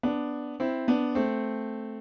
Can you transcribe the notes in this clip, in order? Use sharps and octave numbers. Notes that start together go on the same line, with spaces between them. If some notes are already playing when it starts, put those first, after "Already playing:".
B3 D4
C4 E4
B3 D4
A3 C4